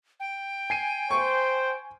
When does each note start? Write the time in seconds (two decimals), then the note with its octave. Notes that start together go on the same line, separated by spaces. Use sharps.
0.20 G5
0.70 G#5 C7 D#7
1.11 C5 C#6